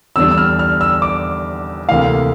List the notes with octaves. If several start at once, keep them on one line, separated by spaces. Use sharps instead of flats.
E2 D3 G3 D4 E6
E6
F6
F6
E6
D6
D2 C3 E3 A#3 F5